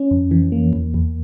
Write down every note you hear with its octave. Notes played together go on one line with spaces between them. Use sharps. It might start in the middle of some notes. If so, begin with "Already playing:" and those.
Already playing: C#4
F2
E3
A#3
E2
E2